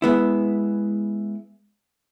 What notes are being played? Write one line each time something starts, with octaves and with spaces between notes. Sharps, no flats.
G#3 B3 E4